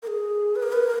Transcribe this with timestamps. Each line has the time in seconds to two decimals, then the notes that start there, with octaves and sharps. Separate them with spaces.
0.03 A#4
0.07 G#4
0.56 B4
0.63 A#4
0.73 B4
0.83 A#4